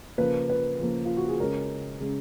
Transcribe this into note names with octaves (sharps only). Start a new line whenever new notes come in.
C#3 F3 A#3 B4
B4
C#3 F3 A#3
F4
F#4
G#4
C#3 G#3 C#4 A#4
C#3 G#3 C#4